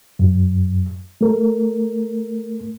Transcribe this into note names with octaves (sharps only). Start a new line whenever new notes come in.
F#2
A3 A#4